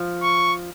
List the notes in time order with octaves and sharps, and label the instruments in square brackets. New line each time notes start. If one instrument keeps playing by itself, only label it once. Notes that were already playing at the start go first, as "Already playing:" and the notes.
Already playing: [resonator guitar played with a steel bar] F3
[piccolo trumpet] C#6